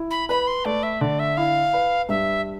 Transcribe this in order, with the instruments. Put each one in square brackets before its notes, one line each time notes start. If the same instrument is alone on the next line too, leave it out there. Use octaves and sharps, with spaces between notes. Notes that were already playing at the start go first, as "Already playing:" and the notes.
Already playing: [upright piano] E4
[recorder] B5
[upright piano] B4 [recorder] B5
[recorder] C6
[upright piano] A3 [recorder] D5
[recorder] E5
[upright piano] D3 [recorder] D5
[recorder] E5
[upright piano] E4 [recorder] F5
[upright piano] B4
[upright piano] G2 [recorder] E5